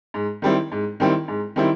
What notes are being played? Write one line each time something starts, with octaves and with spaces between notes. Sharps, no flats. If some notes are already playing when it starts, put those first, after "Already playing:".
G#2
D#3 G3 C4 E4
G#2
D#3 G3 C4 E4
G#2
D#3 G3 C4 E4